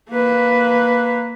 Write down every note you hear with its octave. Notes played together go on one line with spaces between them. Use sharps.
A#3 B4